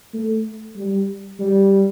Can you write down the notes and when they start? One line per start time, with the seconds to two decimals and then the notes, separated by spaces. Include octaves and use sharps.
0.14 A3
0.76 G3
1.40 G3